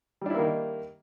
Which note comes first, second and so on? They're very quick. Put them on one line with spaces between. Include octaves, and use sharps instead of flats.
G3 D4 E4 A#3 D#3